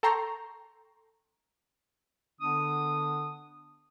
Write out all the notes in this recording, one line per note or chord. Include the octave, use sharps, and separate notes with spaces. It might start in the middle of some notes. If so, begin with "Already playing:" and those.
A4 G5 A#5 C6 C#6
D3 B3 D4 D#6